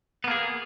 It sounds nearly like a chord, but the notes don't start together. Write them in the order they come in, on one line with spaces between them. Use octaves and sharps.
B3 A#3 G#4